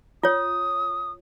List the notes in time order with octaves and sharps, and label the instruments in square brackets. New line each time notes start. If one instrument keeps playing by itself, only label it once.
[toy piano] F4 C#5 [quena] D#6